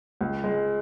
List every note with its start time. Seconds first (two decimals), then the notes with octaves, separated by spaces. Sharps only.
0.21 C#2
0.44 G#3